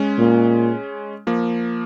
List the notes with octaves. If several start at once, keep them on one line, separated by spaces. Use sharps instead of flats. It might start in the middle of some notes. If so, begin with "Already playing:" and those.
Already playing: G#3 C#4
A#2
F3 A#3